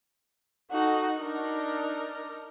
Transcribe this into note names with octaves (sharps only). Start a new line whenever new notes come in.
D#4 F#4 A4
D4 D#4 A#4